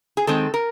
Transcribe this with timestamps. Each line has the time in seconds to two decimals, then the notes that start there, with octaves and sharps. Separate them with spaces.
0.17 G#4
0.27 D#3 G#3 C4 A4
0.54 A#4